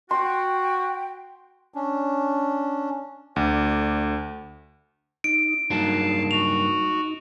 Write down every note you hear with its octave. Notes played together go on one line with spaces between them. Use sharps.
F#4 G5 C6
C#4 D4
D2 D5
D#4 D7
G2 F#3 A#3 D#4 F5 A5
F#4 F7